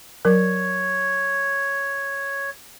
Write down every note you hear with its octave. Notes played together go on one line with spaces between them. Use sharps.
F#3 A#4 C#5